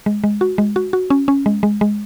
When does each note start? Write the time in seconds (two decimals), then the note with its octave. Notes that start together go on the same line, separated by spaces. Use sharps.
0.06 G#3
0.24 G#3
0.41 F#4
0.58 G#3
0.76 F#4
0.93 F#4
1.10 C#4
1.28 C#4
1.46 G#3
1.63 G#3
1.81 G#3